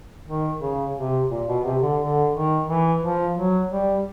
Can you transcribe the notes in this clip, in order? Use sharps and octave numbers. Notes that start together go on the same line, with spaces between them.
D#3
C#3
C3
A#2
B2
C3
D3
D3
D#3
E3
F3
F#3
G3